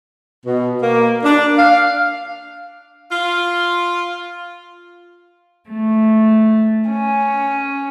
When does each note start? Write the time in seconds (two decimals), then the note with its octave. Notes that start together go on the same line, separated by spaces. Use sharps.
0.45 B2
0.82 A#3
1.24 D4
1.58 F5
3.11 F4
5.69 A3
6.90 C#4